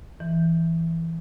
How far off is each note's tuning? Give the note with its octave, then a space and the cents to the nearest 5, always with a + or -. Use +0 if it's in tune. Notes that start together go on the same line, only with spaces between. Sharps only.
E3 +5